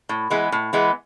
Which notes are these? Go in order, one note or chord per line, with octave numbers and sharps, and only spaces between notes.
A2
E3 G#3 B3
A2
E3 G#3 B3